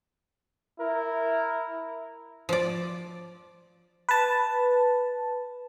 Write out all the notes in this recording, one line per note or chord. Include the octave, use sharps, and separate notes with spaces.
E4 A#4
F3 D5
B4 A5